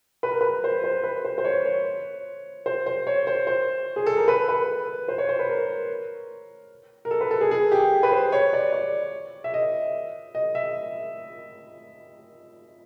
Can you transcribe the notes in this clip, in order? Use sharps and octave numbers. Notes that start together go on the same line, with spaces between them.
B4
A#4
B4
C5
C5
B4
C5
C5
C#5
C#5
C5
C5
C#5
C5
C5
G#4
A4
A#4
B4
B4
C5
C#5
C5
B4
A#4
A#4
A4
B4
A4
G#4
G#4
G4
B4
C5
C#5
D5
D5
E5
D#5
D#5
E5